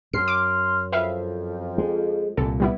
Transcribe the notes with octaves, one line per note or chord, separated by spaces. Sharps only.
F#2 C6 F6 C7
D6
F2 B4 E5 F5
G#3
C2 A#2 A4
G3 B3 E4